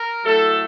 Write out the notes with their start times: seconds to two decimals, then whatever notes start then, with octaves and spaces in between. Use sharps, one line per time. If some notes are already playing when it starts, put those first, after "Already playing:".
Already playing: A#4
0.25 A2 F#3 A3 A4